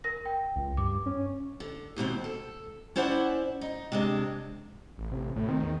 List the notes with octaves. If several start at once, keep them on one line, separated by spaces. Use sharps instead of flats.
A#4 A#6
G5
C#2
G2 D6
C#4
D3
D#2 G#2 B2 C4
A4
C#4 E4 C5 D5 F#5
D#4
C3 G#3 D4
A1
C3
D2 A2
D#3 C4
E2